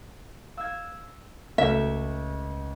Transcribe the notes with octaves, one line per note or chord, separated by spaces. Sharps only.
F5 E6 F6 G#6
C#2 A3 F#4 A4 E5